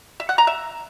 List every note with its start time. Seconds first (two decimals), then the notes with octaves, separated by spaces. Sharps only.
0.20 E5
0.29 F#5
0.38 A#5
0.47 E5